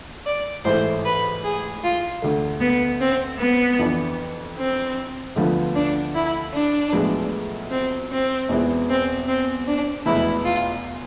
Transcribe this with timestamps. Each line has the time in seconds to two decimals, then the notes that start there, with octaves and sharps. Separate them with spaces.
0.26 D5
0.64 A1 G#2 E3 A3 E4 C5
1.05 B4
1.43 G#4
1.83 F4
2.22 D2 D3 A3
2.60 B3
3.00 C4
3.39 B3
3.79 F2 E3 B3 D4
4.56 C4
5.36 D2 D3 F3 B3 F4
5.75 D4
6.14 E4
6.53 D4
6.92 B1 A2 F3 G#3 B3
7.70 C4
8.10 C4
8.49 E2 B2 G#3 B3 E4
8.89 C4
9.27 C4
9.67 D4
10.05 F1 E2 B2 G#3 B3 E4
10.44 F4